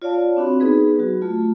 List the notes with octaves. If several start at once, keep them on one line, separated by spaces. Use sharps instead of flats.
F4 C#5 D5 F5 A5
C4 D4 F#4 B5
B3 D#4 G#4 B4
F#3 F#4
A3 F4